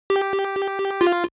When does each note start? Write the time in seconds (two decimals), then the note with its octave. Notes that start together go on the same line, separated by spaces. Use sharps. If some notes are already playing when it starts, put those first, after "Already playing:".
0.10 G4
1.01 F4